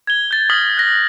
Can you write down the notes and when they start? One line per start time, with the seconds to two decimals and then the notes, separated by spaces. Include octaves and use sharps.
0.07 G#6 G7
0.31 G6 A6
0.50 D#6 F6 A#6 B6 F#7 G7
0.77 F#6 A#6